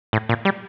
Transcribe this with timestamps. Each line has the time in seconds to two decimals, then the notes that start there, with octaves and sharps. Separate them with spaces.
0.13 A2
0.29 A#2
0.45 G3